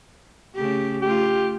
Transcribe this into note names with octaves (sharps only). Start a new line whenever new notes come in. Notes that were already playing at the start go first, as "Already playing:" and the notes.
C#3 A3 G4
A3 F4 G4